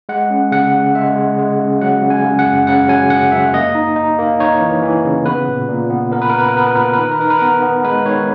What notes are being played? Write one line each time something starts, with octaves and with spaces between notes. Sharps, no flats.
G#3 F#5
C#4
C#3 F#5
C#3
G#3 E5
G#3
G#3
C#3
F#3 F#5
C#3
G#5
C#3
F#5
F#2
C#3 F#5
F#3 G#5
F#2 F#5
F#2 E5
A#3 D#5
D#4
D#4
A#3
D#4 C#5
E3
E3
C#3
B3 B4
A#2
A#2
B3
B3 A#4
B4
B3 A#4
B4
A#4
B3 B4
A#4
A#2 B4
A#4
B4
D#3
A#4
B4
D#4 A#4
B4
B3 A#4
B3
G#3 B4
D#3 C#5